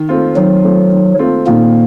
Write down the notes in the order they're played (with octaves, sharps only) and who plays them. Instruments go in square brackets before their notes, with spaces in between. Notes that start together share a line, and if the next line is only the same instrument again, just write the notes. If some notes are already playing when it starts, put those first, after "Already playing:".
Already playing: [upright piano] D#3
A3 C4 F4
[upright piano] D#3 [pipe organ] F#3
[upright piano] A3 C4 F4
D#3
A3 C4 F4
[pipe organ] A#2 A#3 [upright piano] D#3